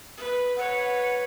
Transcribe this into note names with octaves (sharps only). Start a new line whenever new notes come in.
B4
B4 C#5 F#5